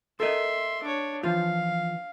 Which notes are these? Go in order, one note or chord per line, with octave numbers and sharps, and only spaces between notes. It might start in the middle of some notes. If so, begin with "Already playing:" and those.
A4 A#4 D#5 E5 C6
D4 C#5
E3 F3 F4 F5